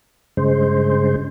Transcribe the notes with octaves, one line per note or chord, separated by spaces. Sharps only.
G2 C#3 G#3 C5